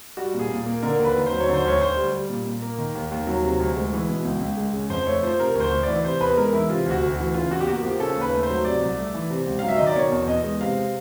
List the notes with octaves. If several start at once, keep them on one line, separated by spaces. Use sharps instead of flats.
G3 F#4
A#2
G#4
A#2
A#3
D3 A#4
D#2
B4
D#2
C5
F#3
C#5
D3
C5
D2 C#5
D2 C5
G3
G3
A#2
A#2
A#3
D#3
D#2
D#2
F#3
C3
D2
G#3
E3
B2
C#2
C#2
G#3
C#3
F2 C5
A3 C#5
F3 C5
C3 A#4
D2
C5
D2
E3 D5
C3 C5
E2 B4
G#3 A#4
E3 E4
C3 F4
D2 F#4
D2
F#4
E3
C#3 F4
E2 F#4
G4
A#3 F#4
F3 G4
C#3 A4
D#2
B4
A3
C5
F#3
C3 D5
C2
A3
E3
C3
C#2
F#3 F5
E5
D#3 D#5
D5
B2 C#5
E2
E2 D#5
G#3
C3 F5